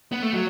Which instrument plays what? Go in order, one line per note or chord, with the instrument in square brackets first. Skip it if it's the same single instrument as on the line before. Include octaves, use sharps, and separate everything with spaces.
[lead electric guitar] B3
A3
F#3